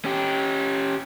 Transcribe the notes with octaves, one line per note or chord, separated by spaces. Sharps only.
C#4 G4